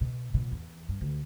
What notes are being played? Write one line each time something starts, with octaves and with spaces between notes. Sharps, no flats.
B2
D#1 B2
E2
G2
D2